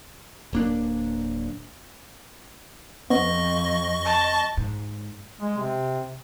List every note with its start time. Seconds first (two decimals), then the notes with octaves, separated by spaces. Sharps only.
0.53 D1 A#3 D4
3.10 F2 B3 D#5 C#6
4.05 A5
4.57 G#2
5.41 G#3
5.58 C3